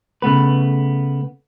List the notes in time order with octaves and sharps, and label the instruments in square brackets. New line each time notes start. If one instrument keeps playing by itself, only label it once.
[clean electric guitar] C#3 A3 B3 B4